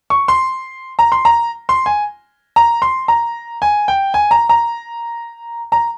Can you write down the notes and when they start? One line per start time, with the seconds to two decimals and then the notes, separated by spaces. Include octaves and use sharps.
0.10 C#6
0.28 C6
0.99 A#5
1.12 C6
1.25 A#5
1.69 C6
1.86 G#5
2.56 A#5
2.82 C6
3.08 A#5
3.62 G#5
3.88 G5
4.14 G#5
4.31 A#5
4.49 A#5
5.72 A#5